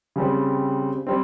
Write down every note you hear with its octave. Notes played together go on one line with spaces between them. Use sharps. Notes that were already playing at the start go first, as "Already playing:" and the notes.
C#3 G3 C4
G3 C4